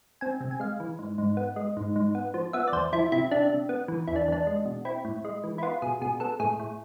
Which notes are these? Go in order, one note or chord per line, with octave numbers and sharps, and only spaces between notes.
C4 G#5
C3
G#5
G#3 F5
E3
G#2
G#2
B3
G#3
G#2
G#2
B3
F3
B3 E5
D5
E2 C5
F3 E4
C3 E4
C3 D4
C3
B3
E3
E2 E4
D4
E2 D4
G#3
B2
C4 E4
A2
G#3
E3
E4
B3 F4
B2 G#4
B2 G#4
B3 A4
A2 G#4
A2